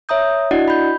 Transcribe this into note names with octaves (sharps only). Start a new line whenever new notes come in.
C#5 E5 A#5 D#6 G6
D4 E4 F#4 D5 D#5 F#5
B5 G6